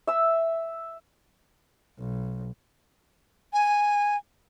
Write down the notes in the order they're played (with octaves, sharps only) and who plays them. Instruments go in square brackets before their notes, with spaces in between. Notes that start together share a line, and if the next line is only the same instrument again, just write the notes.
[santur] E5 E6
[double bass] B1
[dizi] G#5